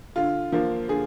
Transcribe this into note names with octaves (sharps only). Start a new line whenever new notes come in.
D3 F4
F3 A#3
D3 G#4